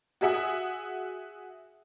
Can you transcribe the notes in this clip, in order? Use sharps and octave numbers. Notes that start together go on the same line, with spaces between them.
F#4 G#4 E5 F#5 D#6